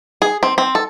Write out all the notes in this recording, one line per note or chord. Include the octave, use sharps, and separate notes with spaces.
G#4
C4
C4
A4